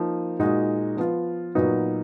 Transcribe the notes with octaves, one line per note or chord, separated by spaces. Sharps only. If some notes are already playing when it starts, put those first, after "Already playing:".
Already playing: F3 A#3 D#4
A#2 G#3 D#4 F#4
F3 B3 F4
A#2 F#3 B3 D#4 F#4